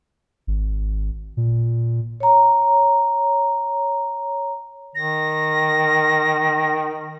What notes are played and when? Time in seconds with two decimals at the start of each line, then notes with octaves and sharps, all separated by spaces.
0.47 G#1
1.37 A#2
2.20 C#5 A#5
4.95 D#3 A#6